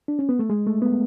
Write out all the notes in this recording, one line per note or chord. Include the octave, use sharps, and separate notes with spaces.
D4
C#4
B3
A3
G#3
A3
B3